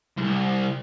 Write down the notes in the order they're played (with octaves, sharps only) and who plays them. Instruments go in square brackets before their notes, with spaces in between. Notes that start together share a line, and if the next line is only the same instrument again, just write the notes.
[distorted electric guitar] C2 G#2